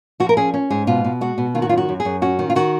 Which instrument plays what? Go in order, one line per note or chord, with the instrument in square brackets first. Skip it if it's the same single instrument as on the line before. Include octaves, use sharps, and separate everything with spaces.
[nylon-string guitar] F3 F#4
A#4
C#4 G#4
C#4
G#2 G#4
B2 F4
B2
G#3 F#4
B2
D#3 F4
F#4
F#2 F4
F#4
F#2
G#4
F#2
C#4 F#4
D#3
F4
D#3 F#4